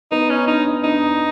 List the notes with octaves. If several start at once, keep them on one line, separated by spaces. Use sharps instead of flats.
B3 D#4
C#4
D4 D#4
D4 D#4